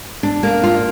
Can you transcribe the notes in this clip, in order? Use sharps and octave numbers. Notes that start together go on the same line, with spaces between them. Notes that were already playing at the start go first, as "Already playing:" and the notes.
D4
A#3
F4